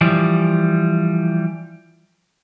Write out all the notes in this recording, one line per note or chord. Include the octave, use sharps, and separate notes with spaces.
E3 F3 G3